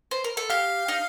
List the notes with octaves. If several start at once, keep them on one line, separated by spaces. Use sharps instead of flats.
C5
A#4
A4
G4 F5
D#4